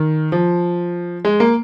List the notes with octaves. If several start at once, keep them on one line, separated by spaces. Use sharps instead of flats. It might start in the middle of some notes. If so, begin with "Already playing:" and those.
Already playing: D#3
F3
G#3
A#3